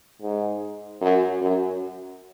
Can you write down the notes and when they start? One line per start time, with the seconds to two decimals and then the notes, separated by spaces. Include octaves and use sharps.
0.22 G#2
1.01 F#2
1.41 F#2